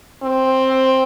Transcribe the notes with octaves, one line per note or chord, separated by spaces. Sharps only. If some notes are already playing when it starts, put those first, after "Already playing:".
C4